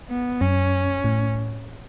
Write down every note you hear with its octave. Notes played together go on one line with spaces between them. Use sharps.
B3
F#2 C#4
A2